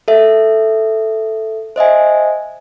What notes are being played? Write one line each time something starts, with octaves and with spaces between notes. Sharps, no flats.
A4 E5
C5 D#5 E5 G#5